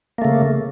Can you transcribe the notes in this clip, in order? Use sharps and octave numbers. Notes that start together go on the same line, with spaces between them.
C#3 A3 A#3